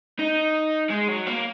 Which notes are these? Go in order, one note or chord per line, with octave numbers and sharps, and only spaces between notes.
D#4
G#3
F#3
A#3